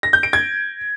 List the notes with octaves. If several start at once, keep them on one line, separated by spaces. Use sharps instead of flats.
A#6
G6
D7
G#6